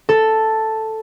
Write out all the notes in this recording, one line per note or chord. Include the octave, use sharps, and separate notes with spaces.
A4